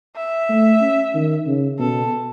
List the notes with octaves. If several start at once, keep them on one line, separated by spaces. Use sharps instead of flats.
E5
A3
C#4
D#3
C#3
B2 A4